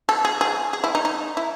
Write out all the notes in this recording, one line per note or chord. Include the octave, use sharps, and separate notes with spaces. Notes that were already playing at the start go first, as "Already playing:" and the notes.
A4
G#4
G#4
G#4
E4
D#4
D#4
E4